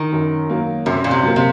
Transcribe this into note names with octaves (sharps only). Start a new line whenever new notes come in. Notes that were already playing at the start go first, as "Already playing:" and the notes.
Already playing: D#3
F#2
F#3 A#3
F#2 C3
A#2
C3
F#3 A#3
C3